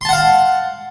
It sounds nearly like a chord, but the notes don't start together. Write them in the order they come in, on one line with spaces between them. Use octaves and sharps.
C6 A5 F#5 F5